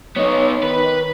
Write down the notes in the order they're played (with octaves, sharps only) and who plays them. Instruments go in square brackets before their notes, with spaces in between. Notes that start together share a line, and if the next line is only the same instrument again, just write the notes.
[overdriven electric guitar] B3 D#4 [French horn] C#5
[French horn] D#3 [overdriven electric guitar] B4